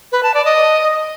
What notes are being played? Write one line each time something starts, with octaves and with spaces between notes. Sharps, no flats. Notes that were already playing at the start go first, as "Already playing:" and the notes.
B4
A5
D5
D#5